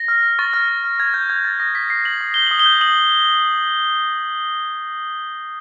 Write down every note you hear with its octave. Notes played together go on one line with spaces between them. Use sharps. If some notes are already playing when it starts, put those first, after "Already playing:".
Already playing: A#6
F6
F6
C#6 A6
F6
F6
F6
F6 G#6
F6 G6
F6 G#6
F6 A6
D#6 A#6
D#6 B6
G6 C7
G6 F#7
D#6
G6 G7
D#6 F#7
G7
G6
D#6 F#7